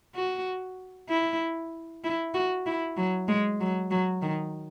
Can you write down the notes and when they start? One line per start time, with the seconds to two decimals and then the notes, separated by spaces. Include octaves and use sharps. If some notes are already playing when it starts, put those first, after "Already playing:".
0.15 F#4
1.09 E4
2.04 E4
2.34 F#4
2.66 E4
2.97 F#3
3.28 G#3
3.61 F#3
3.91 F#3
4.22 D#3